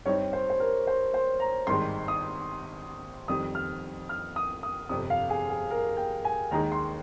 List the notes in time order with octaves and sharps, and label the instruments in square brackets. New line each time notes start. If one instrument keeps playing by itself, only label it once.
[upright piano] G2 G3 C4 D#4 G4 [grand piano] C#5
[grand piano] C5
C5
A#4
C5
C5
A#5
[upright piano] G#1 G2 D#3 G#3 [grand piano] C6
[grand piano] D#6
[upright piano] F2 D#3 G3 [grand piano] D#6
[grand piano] F6
F6
D#6
D#6
[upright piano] G1 F2 C3 [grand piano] D#6
[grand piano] F5
G#4
G#4
A#4
G5
G#5
[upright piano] D#2 D#3 G#3 D#4 G#4 [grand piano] A#5
[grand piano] C6